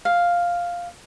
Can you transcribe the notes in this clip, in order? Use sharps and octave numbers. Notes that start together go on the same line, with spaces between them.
F5